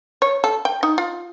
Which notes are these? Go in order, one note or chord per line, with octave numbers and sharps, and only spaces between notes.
C#5
A4
G5
D#4
F4